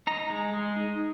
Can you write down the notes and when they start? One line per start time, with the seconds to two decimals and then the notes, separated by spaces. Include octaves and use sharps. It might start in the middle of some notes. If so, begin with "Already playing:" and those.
0.07 D#4 A#5
0.30 G#3
0.53 G#3
0.76 D#4